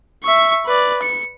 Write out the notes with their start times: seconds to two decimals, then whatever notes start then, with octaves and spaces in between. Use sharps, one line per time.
0.24 E5 C#6
0.66 B4 D5
1.02 C#7